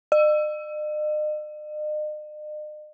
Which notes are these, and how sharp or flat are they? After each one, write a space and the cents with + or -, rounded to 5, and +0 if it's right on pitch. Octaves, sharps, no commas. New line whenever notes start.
D#5 -45